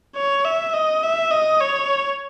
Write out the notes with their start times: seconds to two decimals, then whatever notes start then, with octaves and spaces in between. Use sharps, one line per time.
0.16 C#5
0.45 E5
0.74 D#5
1.03 E5
1.31 D#5
1.61 C#5